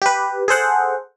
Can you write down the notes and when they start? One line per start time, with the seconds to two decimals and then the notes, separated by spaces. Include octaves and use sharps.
0.02 G4 B4
0.48 G#4 A4 C5 F#5